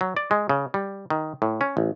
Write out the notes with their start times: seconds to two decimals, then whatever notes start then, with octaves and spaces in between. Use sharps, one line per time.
0.01 F#3
0.17 D5
0.31 G#3
0.49 C#3
0.74 G3
1.10 D#3
1.42 A2
1.61 C#4
1.77 A1